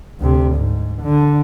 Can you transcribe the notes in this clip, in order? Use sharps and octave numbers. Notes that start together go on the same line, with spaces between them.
D2 C3
G#2
D3